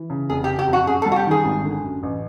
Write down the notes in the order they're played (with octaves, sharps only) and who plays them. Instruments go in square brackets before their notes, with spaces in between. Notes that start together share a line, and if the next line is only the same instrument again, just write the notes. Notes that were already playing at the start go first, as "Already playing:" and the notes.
Already playing: [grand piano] E3
C#3
[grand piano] F1 [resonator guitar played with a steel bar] G#4
[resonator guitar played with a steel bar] G4
[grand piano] C#3
[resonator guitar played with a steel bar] G4
[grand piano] F2
[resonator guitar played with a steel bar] F#4
[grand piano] F#2 [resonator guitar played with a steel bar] G#4
[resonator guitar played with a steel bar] A4
[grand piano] G3
[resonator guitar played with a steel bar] F#4
G4
[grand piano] D#3 [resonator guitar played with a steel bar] G#4
[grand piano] G#1
D3
F#2
A1